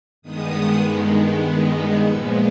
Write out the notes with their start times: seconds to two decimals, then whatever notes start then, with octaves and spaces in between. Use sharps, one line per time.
0.22 G2 D#3 G#3 B3 D#6
2.05 A#2 F3 G#3 B3 E6